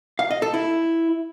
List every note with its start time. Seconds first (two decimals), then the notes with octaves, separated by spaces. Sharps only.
0.19 F5
0.31 D#5
0.42 A4
0.54 E4